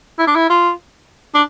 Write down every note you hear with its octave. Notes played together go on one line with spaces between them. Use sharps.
E4
D4
E4
F4
D4